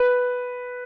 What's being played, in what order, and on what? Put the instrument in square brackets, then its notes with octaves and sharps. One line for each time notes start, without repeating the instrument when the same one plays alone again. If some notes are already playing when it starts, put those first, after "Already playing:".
Already playing: [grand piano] B4